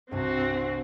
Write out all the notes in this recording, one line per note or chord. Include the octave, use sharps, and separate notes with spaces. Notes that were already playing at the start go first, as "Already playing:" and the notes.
C2 G2 C4 F#4